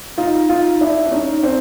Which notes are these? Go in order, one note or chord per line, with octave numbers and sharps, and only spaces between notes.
D#4 F4
D#4 F4
D4 E4
D4
C#4 D#4
C4 D4